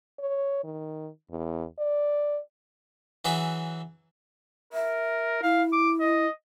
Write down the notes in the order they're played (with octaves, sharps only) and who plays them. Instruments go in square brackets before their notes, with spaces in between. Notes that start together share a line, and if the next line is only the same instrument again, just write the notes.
[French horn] C#5
D#3
E2
D5
[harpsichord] E3 F#3 G#4 E5
[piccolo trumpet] A#4 [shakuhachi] E5
[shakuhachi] E4 [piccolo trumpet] F5
[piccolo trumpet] D6
D#5